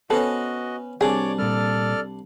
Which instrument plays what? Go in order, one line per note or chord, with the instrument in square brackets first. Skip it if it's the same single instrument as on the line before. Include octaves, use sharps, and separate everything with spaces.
[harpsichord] B3 C#4 [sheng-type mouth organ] F#4 D#5 [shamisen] A4 [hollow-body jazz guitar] B4 C5
[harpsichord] C2 D4 [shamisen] G#4 [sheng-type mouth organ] C#5 D5 D6
[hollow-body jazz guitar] A#2 G3 [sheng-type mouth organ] A4 D5 F6